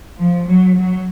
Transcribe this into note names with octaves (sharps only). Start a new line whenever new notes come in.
F3
F#3
F#3